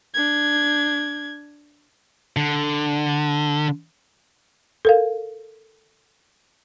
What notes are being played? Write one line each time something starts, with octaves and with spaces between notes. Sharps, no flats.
D4 G#6
D3
A4 A#4 F5